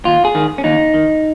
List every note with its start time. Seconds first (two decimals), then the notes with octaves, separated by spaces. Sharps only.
0.05 D#2 F4
0.25 G#4
0.35 D#3
0.58 C#4
0.64 D#2 D#4
0.94 D#3